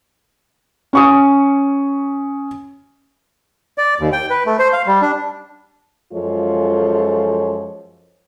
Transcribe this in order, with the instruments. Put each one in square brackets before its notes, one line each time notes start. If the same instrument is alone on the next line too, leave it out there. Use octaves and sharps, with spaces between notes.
[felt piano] C#4 C#6 D#6
[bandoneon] D5
D#2
G5
B4
A3
C5
F5
G3
D4
[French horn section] F#2 F3 G#3 F4 A4 C#5